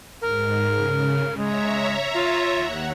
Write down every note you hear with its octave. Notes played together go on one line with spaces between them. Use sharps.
G#2 A#4
C#3
G#3 C#5 E5 A#5
F4
D#2 F#5